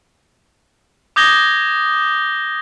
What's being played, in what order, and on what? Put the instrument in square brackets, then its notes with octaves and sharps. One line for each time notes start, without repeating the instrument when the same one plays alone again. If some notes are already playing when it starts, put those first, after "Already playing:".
[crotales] D6 D#6 G6 G#6 A#6 G7